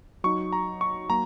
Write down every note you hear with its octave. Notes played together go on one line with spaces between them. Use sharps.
F#3 D#4 C#6
A#5
C#6
F#3 A#3 A#5